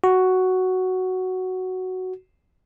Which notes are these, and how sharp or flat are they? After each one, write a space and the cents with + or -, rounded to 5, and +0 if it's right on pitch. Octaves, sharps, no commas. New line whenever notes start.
F#4 +5